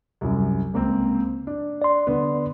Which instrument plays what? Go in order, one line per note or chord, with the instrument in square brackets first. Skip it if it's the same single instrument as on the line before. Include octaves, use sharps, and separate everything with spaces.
[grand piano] C2 F#2
C#2 A#3 C4
D4
[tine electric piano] D5 C6
[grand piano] D3 B3